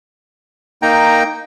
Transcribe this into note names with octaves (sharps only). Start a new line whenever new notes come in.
A#3 D#4 G5 A#5